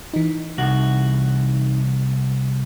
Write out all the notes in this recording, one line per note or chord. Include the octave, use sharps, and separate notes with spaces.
E3 D#4
C2 F#4